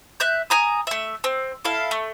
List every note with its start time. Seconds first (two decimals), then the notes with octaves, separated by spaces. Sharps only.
0.20 E5 F#6 G6
0.50 G#5 A#5 D#6
0.87 A3 E5
1.24 C4
1.65 E4 A4 F5
1.91 A3